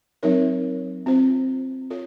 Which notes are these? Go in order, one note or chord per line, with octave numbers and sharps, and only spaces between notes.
F#3 C4 D#4 A#4 C#5
C4 F4 C5
F4 A4 C#5